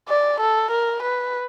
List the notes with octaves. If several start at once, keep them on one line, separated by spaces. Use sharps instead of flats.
D5
A4
A#4
B4